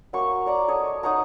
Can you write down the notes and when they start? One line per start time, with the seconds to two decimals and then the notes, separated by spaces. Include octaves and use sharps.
0.13 F#3 A#3 C#6
0.46 C#5 D5 A#5
0.68 A4 C#5 D#5
1.03 D#4 C#5 F#5 A#5